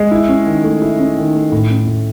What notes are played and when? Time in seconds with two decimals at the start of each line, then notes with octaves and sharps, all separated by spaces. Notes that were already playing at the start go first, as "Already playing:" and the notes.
Already playing: G#3
0.11 E4
0.29 C#4
0.46 D#3
0.64 A3
0.82 E4
0.99 C#4
1.18 D#3
1.35 A3
1.52 A2
1.70 C#4
1.87 A2